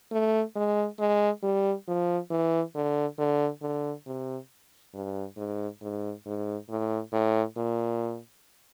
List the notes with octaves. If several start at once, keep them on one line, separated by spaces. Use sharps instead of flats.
A3
G#3
G#3
G3
F3
E3
D3
D3
D3
C3
G2
G#2
G#2
G#2
A2
A2
A#2